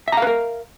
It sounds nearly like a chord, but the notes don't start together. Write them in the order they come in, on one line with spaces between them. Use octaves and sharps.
E5 A#5 F5 B4 A#4